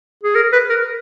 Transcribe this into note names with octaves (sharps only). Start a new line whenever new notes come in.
G#4
A#4
B4
A#4